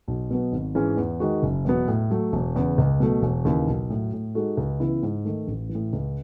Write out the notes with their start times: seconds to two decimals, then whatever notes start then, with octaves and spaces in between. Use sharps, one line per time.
0.08 B1
0.30 B2 F#3 B3
0.52 G#1
0.75 G#2 E3 G#3 C#4
0.97 E2
1.20 D#3 G#3 D#4 F#4
1.43 F#1
1.65 E2 B2 F#3 B3
1.88 A2
2.10 F#3 A3
2.33 E1
2.56 E2 C#3
2.78 C#2
3.00 B2 F#3 A3
3.23 E1
3.45 D#2 C#3 E3
3.67 B1
3.90 A2 F#3
4.13 A2
4.35 G#3 D#4 F#4 A4
4.57 C#2
4.80 C#3 E3 B3 E4
5.03 G#2
5.25 D#3 A3
5.48 A1
5.69 E3
5.75 A2
5.93 C#2